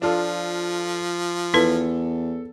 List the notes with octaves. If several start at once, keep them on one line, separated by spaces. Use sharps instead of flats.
F3 D4 F4 A4
E2 E4 A4 B4